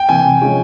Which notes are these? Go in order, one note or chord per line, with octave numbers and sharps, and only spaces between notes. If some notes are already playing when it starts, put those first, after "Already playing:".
Already playing: G5
C3 E3 G#5
C3
F3 G#3 C#4